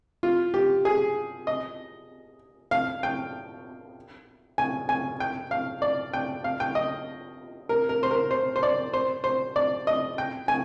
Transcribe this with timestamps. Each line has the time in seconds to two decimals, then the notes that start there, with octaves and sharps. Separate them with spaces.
0.23 F4
0.54 G4
0.85 G#4
1.47 D#5
2.71 F5
3.03 G5
4.58 G#5
4.89 G#5
5.20 G5
5.51 F5
5.82 D5
6.13 G5
6.44 F5
6.60 G5
6.75 D#5
7.69 A#4
7.89 A#4
8.03 C5
8.11 A#4
8.31 C5
8.56 C5
8.63 D5
8.94 C5
9.24 C5
9.56 D5
9.87 D#5
10.18 G5
10.48 G#5